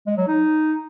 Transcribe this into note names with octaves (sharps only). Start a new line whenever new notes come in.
G#3
F#3
D#4